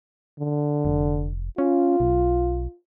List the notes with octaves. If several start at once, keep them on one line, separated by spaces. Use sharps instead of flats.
D3
F1
C#4 F4
B1